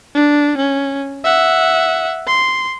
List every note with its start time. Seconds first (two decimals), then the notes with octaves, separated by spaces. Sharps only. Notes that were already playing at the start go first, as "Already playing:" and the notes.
0.15 D4
0.57 C#4
1.25 E5 F#5
2.27 C6